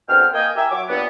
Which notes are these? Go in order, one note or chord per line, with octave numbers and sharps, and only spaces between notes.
D2 B2 G#3 C4 G5 F6
A#3 D#5 G5 G#5
E4 G4 A#4 E5 G#5 E6
F#3 C#5 D6
G2 A#2 B3